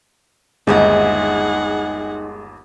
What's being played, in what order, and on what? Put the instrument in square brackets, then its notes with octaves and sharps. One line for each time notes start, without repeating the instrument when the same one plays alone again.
[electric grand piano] G1 D#2 [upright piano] G#3 [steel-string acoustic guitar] D#4 D#5 E5 [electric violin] G#4 F#5